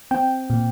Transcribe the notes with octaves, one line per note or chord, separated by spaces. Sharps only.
C4 G5
A#2